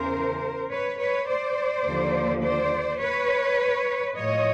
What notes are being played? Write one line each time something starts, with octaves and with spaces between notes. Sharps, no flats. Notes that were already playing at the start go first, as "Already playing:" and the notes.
Already playing: E2 C#3 E3 A#4 C5
B4 C#5
B4 C#5
C5 D5
D#2 D3 F3
C5 D5
B4 C#5
A2 F3 C#5 D#5